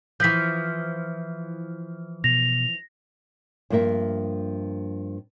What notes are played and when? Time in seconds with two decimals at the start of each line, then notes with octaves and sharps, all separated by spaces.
0.20 E3 F3 G6 B6
2.24 B2 A#6 F7
3.70 G2 F3 A#3 A#4 E5